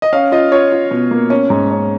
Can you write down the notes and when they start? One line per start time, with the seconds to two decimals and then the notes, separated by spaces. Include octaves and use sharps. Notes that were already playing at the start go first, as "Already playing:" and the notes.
0.02 D#5
0.13 C#4 F5
0.32 F4 D#5
0.52 F4 C#5
0.72 F4
0.91 B2
1.11 A#3
1.30 C#4
1.50 G#2
1.71 C#4